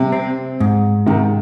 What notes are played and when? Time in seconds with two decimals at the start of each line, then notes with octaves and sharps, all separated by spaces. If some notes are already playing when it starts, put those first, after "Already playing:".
Already playing: C3 G3
0.12 C4
0.60 G#2
1.06 G#2 C3 D#3